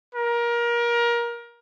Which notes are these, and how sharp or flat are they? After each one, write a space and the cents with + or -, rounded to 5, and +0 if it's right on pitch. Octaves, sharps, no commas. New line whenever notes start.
A#4 +25